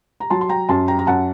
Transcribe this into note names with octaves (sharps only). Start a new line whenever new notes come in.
A#5
F#3 A5 C6
C6
G5 A#5
F#2 A5 C6
G5 A#5
A#5
F#2 F#5 A5